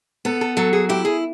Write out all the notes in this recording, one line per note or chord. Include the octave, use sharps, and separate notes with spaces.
B3 A4
A4
F#3 A4
G#4
E4 G4
G#4